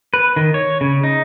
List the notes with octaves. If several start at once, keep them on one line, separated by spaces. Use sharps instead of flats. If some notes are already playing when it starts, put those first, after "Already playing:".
B4
D#3
C#5
C#3
D#4